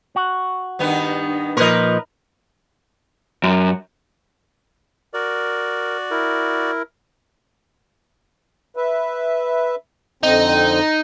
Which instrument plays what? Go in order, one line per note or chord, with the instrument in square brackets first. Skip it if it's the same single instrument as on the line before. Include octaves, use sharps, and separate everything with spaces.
[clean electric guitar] F#4
[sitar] G2 D#3 B3
[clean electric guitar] A#2 F3 [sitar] A#4 B4 D#5
[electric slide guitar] F#2
[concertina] F#4 D5 [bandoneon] A#4
[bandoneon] E4 A#4
[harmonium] B4 E5
[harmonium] F2 D3 C4 [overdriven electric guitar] D#4